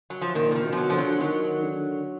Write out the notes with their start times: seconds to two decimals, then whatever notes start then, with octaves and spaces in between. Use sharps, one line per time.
0.10 F#3
0.21 F3
0.34 A#2 D#3
0.51 D3
0.55 D#3
0.63 B2
0.72 F3
0.77 F#3
0.90 D3 F3
0.98 F#3
1.20 D#3 F#3
1.62 D3